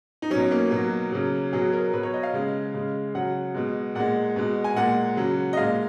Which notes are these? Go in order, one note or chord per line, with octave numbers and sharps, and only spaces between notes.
D#4
B2 F#3 C#4
A#3
B2 F#3
C#3 F#3
B2 F#3 G#4
A#4
B2 F#3 B4
C#5
D#5
F5
C#3 G#3
C#3 G#3
C#3 F#3 F#5
B2 G#3
A#2 G#3 F#5
B2 G#3
G#5
A#2 G#3 F#5
C#3 F#3
D#5
A#2 G#3 F5